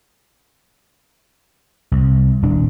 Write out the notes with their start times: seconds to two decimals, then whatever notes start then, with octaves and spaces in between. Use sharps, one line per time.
1.92 C2
2.42 D#1 D4